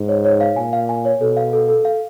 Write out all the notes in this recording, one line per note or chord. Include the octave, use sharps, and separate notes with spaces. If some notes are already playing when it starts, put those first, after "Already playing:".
Already playing: G#2
C#5
C#5
F5
A#2 G#5
F5
G#5
C#5
B2 A4
F5
A4
A4
F5